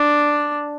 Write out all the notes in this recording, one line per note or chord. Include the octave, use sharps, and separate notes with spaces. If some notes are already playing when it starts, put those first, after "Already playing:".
Already playing: D4